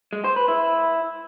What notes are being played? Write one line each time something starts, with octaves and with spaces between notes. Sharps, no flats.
G#3
C5
B4
E4